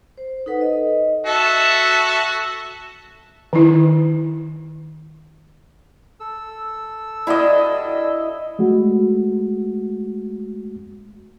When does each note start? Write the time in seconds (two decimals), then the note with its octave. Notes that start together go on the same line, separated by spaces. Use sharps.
0.18 C5
0.46 D#4 A4 B4 F#5
0.61 D#5
1.26 F#4 A4 E5
3.53 D#3 E4
6.20 A4 E6
7.27 G3 D4 E4 F#4 D#5
8.59 G#3 A3 F#4